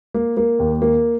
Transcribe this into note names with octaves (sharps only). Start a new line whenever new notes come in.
A#3
A#3
D#2
A#3